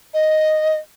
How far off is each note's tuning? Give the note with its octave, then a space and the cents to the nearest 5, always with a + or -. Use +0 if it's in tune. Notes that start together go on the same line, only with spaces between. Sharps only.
D#5 +0